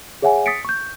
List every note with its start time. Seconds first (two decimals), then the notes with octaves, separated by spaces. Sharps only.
0.22 G#4 C#5 E5 F#5 G#5
0.46 D#6 A6 B6 C#7 D7
0.65 C#6 G6